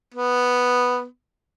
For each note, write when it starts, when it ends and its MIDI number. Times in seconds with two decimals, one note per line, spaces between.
0.14 1.04 59